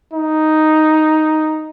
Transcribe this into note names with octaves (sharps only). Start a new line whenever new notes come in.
D#4